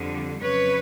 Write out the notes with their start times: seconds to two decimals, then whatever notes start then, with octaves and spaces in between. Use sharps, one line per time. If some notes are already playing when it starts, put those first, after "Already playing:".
Already playing: F2 D3 G3
0.40 F2 C#3 F#3 B4 C#5